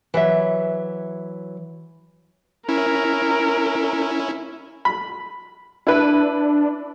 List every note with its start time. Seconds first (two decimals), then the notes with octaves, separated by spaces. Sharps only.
0.14 E3 F#3 E5
2.69 C#4 E4 A#4
4.85 B5
5.87 D4 E4 B4